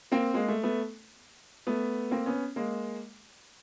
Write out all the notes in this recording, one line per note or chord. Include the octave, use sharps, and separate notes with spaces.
A#3 C4
G#3 A#3
A3
A3 B3
A3 B3
A#3 C4
B3 C#4
G#3 A#3